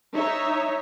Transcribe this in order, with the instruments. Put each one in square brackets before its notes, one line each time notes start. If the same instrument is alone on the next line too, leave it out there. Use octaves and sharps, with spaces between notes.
[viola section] D#4 C#5 E5